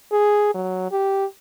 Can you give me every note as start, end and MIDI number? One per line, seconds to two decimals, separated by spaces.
0.12 0.50 68
0.54 0.89 54
0.92 1.26 67